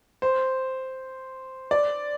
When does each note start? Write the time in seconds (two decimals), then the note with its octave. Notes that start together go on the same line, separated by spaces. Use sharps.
0.22 C5
1.71 D5